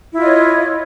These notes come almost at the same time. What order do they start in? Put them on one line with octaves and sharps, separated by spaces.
E4 F4 D#5 C#5